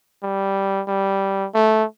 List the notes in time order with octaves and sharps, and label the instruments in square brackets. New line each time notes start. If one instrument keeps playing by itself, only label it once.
[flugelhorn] G3
G3
A3